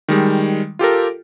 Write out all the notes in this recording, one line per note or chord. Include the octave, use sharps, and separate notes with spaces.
D#3 G3 G#3
F4 G4 A4 A#4